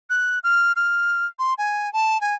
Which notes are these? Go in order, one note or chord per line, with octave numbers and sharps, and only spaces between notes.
F#6
F6
F6
C6
G#5
A5
G#5